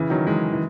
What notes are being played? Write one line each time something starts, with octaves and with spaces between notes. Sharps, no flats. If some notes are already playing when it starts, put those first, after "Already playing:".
Already playing: C#3 E3
D#3 F#3
E3 G#3
E3